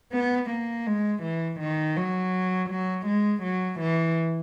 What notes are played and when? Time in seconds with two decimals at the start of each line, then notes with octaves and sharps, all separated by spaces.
0.13 B3
0.50 A#3
0.86 G#3
1.23 E3
1.60 D#3
1.97 F#3
2.69 F#3
3.06 G#3
3.43 F#3
3.80 E3